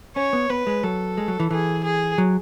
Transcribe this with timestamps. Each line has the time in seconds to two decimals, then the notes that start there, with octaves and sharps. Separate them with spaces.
0.16 C#4 C#5
0.33 B3
0.50 B3 B4
0.67 G#3
0.83 F#3 A4
1.18 G#3
1.28 F#3
1.40 E3
1.51 E3 G#4
1.84 G#4
2.18 F#3